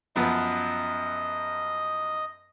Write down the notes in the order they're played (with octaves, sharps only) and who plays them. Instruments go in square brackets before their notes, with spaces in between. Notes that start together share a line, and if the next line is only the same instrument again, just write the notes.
[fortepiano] F#2 F3 B3 [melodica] D#5